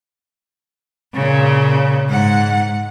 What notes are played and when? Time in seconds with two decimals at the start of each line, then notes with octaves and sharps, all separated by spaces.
1.15 A#2 C#3
2.09 G#2 F#5